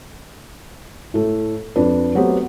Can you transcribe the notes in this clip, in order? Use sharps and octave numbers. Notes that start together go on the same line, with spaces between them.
A2 A3
F2 D4 B4
F#3 A3 B3 C4 G4